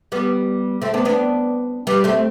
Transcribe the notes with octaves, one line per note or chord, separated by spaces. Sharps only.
G3 B3
A3 C4
B3 D4
B3 D4
G3 B3
A3 C4